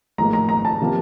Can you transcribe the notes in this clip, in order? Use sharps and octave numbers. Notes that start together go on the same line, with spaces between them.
A1 G#2 F3 A#3 A#5
A#5
A#5
A5
C3 F3 A#3